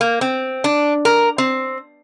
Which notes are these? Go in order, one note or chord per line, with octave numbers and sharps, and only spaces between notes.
A#3
C4
D4
A#4
C4